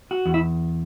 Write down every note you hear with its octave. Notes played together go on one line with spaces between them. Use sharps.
F#4
E2
E4